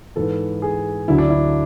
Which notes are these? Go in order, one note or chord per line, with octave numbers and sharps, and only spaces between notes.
G#2 E3 A4
G#4
D2 D3 F#3 E4
D4
E4